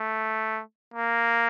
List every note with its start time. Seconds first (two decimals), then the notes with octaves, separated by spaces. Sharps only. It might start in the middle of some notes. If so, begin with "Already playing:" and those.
Already playing: A3
0.94 A#3